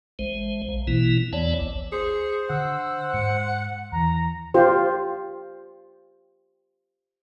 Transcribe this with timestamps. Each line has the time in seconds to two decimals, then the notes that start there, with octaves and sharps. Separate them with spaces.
0.19 A1 G#3 C5
0.69 A#1
0.87 B2 E3 A#3 E4
1.33 E2 E3 B3 C#5 D5 A5
1.59 G#1 D2
1.92 G#4 C5 C#7
2.50 D3 F#5 E6
3.14 G#2 C#7
3.92 E2 E3 A#5
4.54 F4 G4 C5